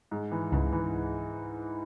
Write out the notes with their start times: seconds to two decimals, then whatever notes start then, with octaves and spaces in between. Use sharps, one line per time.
0.11 G#2
0.32 E3
0.52 C#2 G#2 C#3
0.73 E3